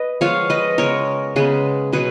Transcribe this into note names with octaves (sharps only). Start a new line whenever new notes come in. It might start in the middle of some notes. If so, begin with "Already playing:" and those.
Already playing: B4 D#5
F3 G#3 B3 C#5 F5
B4 D#5
C#3 G#3 B3 A#4 C#5
C#3 G#3 B3 G#4 B4
B2 F#3 G#4 B4